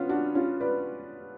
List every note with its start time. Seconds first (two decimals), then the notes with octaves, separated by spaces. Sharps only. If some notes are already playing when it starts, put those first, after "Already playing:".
Already playing: B3 C#4 F4
0.09 D4 F#4
0.35 C#4 F4
0.60 B4 D5